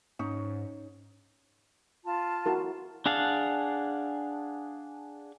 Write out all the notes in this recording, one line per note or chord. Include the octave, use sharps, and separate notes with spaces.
G#2 C#4 D#4
F4 A5
E4 F#4 A#4
D4 G#4 F5 F#5 A5